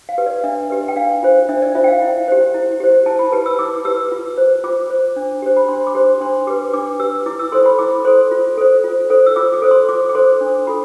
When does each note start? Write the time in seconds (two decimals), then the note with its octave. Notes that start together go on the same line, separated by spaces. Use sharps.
0.09 F5
0.18 G4 B4
0.26 D5
0.44 D4 E5
0.70 G4 B4
0.88 G5
0.96 D4 F5
1.23 F4 C5
1.49 D4 E5
1.62 D5
1.75 F4 C5 E5
1.84 G5
1.88 F5
2.02 E4
2.28 G4 C5
2.54 E4
2.80 G4 C5
3.06 E4 A5
3.19 B5
3.32 G4 B4 A5
3.46 E6
3.59 E4 D6
3.85 G4 B4 E6
4.12 F4
4.38 C5
4.64 F4 D6
4.90 C5
5.16 D4
5.42 G4 C5
5.57 B5
5.68 D4 C6
5.87 D6
5.95 G4 C5 C6
6.21 D4 C6
6.47 G4 B4 D6
6.74 D4 D6
7.00 G4 B4 E6
7.26 E4 D6
7.39 E6
7.52 A4 C5 C6
7.66 B5
7.79 E4 D6
8.05 A4 C5 C6
8.31 F4
8.58 A4 C5
8.84 F4
9.10 A4 C5
9.26 E6
9.36 F4 D6
9.54 D6
9.62 A4 C5
9.71 C6
9.89 F4 D6
10.09 D6
10.15 A4 C5 C6
10.41 D4
10.67 F4 A4 B5